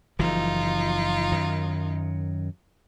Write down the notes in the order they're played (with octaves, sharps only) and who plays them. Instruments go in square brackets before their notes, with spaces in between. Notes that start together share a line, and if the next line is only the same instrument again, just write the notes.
[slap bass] F#1 E3 F3 [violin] D#4 F4
[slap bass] F#2 D#3 F#3